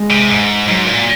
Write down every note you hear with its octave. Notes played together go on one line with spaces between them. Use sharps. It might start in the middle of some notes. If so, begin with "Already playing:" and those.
Already playing: G#3
C3
G#2
G#2 F#3
A#2